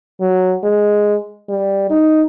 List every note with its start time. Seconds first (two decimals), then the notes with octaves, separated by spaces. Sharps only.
0.20 F#3
0.63 G#3
1.49 G3
1.90 D#4